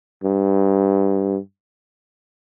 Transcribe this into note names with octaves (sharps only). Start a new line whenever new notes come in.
G2